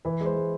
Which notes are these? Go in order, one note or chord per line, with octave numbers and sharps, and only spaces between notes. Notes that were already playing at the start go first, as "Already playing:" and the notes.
E3 B4
G#3 C5
G#3